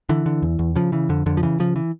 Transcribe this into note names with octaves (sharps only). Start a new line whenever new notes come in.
D3 E3
D3
E2
E2
C#3 F3
C#3 E3
F2 D3
F2 D3
F3
C#3 E3
C#3 F3
E3